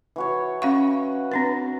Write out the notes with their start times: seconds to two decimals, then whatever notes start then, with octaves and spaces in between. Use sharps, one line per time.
0.16 E3 F#4 C#5
0.62 C#4 F5 F#5 C#6
1.32 C4 D4 B4